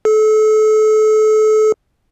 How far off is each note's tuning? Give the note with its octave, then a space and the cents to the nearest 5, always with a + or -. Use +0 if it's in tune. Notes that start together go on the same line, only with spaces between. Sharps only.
A4 -30